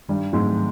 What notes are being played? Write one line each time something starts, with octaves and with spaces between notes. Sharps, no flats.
G2 D#3 G3
G#2 F#3 G#3 A3 C4